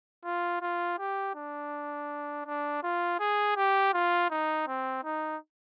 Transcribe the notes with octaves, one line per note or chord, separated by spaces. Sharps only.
F4
F4
G4
D4
D4
F4
G#4
G4
F4
D#4
C4
D#4